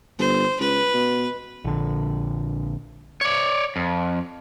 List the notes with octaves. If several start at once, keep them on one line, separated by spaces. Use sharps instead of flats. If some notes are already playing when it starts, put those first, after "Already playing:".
G1 C5
C#2 B4
B2
A#1 D3
C#5 D5
F2